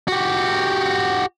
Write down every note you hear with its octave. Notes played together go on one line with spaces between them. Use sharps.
F#4 G4